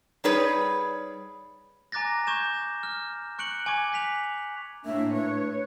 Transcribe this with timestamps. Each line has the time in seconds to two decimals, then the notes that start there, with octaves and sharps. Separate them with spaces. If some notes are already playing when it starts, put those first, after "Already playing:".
0.24 G3 D#4 G#4 B4 C#5 D5
1.92 G#5 A#5 D6 F#6 A6 A#6
2.27 C#6 D6 G6 G#6 E7
2.83 F6
3.39 C#6 F#6 C#7 D7 F#7
3.66 G#5 C#6 D6 G#6
3.93 F#6 B6 F7
4.85 A2 A#3 D4 E5
5.14 B4 C#5